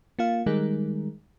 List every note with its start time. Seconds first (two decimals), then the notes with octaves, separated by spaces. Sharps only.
0.19 A#3 F4 F5
0.46 D#3 G3 G#3 D#4 G#4 A#4